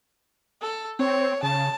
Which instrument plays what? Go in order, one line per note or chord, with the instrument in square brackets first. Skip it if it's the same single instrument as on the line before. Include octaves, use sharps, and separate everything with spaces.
[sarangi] A4
[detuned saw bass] C4 [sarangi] C#5
[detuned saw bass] C#3 [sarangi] A5